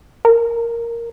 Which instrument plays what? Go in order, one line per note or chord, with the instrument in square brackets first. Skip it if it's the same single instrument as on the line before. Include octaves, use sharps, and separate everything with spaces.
[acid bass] A#4